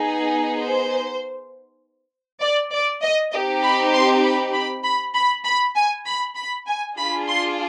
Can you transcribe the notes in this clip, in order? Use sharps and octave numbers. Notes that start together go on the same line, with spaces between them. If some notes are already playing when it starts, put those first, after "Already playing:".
Already playing: B3 D#4 G#4
C5
D5
D5
D#5
C4 D#4 G4 D#5
B5
C6
B5
B5
B5
B5
B5
G#5
B5
B5
G#5
D4 F4 G#4 B5
C6